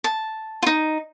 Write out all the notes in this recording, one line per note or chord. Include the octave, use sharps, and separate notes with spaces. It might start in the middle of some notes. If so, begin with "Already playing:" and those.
A5
D#4 F4